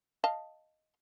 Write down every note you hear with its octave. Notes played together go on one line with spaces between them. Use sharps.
D#5 F5 A5